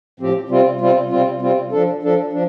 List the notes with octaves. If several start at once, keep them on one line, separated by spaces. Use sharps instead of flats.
A2 F3 C4 G4
C3 G3 C4 F4
C3 G3 C4 F4
C3 G3 C4 F4
C3 G3 C4 F4
F3 D4 A4
F3 D4 A4
F3 D4